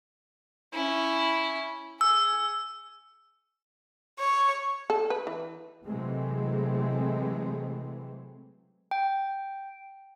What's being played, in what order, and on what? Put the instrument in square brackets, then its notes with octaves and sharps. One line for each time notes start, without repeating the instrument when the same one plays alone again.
[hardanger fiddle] C#4 E4
[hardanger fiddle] G#4 [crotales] E6
[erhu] C#5
[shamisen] A4
B4
E3
[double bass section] C3 E3 F#3 G#3 A3 C4
[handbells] G5